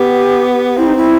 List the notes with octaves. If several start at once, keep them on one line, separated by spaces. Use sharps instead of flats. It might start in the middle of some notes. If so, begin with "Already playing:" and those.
Already playing: B3 G4
C4 E4
D#4
E4